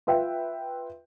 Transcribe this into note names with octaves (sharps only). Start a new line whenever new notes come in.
F4 B4 E5 G5